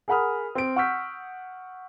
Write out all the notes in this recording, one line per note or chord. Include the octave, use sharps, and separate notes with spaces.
G#4 A#4 F#5 B5 D#6 F6
C4 D7
F#5 C#6 E6 F6 G6 B6